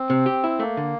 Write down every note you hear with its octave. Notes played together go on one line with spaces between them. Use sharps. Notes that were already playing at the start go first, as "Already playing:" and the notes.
Already playing: C4
C3
G4
E4
A3 A#3
D3